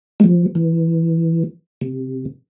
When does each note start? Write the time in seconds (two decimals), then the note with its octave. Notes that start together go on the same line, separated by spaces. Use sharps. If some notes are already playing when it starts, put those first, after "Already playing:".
0.20 G#3
0.24 F3
0.55 E3
1.81 C3